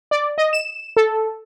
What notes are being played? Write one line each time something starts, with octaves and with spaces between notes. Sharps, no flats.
D5
D#5
E7
A4